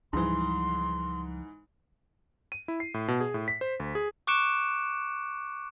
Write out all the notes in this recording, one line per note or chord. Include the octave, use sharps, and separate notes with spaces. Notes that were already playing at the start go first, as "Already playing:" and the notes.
C#2 G#2 E3 F3 G3 C6
D#7
E4
C7
A2
B2
G#4
A2
B6
C5
D2
G#4
C#6 D6 F#6 C#7 D7 E7